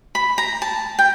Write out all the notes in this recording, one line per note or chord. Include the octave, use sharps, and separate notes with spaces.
B5
A#5
A5
G5